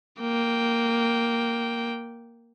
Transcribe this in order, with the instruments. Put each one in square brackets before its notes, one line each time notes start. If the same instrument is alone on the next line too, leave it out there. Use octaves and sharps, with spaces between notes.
[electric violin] A#3 G5